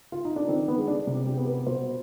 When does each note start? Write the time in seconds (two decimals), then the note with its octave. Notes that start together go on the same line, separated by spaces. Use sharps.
0.12 F4
0.25 D#4
0.36 D4
0.48 D#3 C4
0.68 B3
0.78 G#3
0.88 D4
1.07 C3
1.27 G4
1.37 B3
1.47 B4
1.67 B2 C5